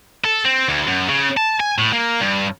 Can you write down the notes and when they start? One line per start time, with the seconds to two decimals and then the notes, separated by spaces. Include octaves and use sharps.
0.24 A4
0.45 C4
0.68 D2
0.87 F#2
1.09 C#3
1.37 A5
1.60 G#5
1.78 A2
1.93 A#3
2.20 G2